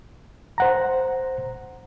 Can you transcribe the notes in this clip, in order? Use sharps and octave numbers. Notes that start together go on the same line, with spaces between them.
C5 F#5 A#5